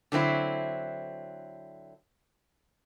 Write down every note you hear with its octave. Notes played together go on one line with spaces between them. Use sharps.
D3 F#3 C4 E4